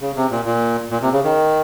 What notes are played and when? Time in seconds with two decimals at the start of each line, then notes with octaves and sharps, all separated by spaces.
0.01 C#3
0.16 C3
0.31 A#2
0.45 A#2
0.90 A#2
1.02 C3
1.12 C#3
1.24 D#3